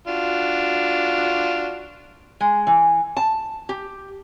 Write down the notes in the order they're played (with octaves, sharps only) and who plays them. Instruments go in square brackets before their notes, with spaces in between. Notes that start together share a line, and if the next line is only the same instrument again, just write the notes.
[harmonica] D4 F4 F#4
[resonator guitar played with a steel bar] G#3
E3
A5
G4